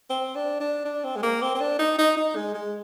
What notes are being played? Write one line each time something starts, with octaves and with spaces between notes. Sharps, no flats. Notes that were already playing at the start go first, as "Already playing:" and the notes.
C4
D4
D4
D4
C4
G#3
A#3
C4
C4
D4
D#4
D#4
D#4
G#3
G#3